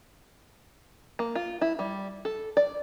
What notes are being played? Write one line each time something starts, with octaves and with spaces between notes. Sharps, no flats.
A#3
F4
E4
G3
A4
D5